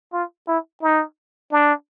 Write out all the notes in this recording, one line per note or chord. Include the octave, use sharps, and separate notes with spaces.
F4
E4
D#4
D4